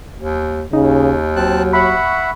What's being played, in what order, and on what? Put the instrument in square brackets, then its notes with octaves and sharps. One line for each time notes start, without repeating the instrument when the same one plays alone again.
[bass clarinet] D#2
[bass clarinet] D#2 [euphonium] C#3 [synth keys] D#4
[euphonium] F#3 [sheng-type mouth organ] C4 A5 F#6
[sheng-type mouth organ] E5 F#5 [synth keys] B5 C#6